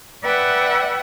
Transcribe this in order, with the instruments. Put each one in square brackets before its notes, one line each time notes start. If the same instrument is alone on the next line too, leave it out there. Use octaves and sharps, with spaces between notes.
[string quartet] B4 D5 E5 F#5 G5